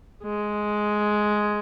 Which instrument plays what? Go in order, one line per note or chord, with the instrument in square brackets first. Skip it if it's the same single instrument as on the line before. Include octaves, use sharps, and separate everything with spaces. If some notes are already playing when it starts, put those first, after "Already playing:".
[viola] G#3